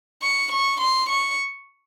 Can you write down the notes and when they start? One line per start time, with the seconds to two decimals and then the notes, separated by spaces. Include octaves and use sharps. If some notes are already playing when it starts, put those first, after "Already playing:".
0.22 C#6
0.52 C#6
0.80 C6
1.09 C#6